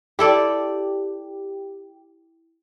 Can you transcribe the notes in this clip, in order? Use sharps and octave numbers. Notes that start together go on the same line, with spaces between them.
E4 G4 A4 D5